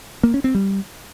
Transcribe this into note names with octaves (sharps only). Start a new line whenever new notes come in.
A#3
C#4
C4
G3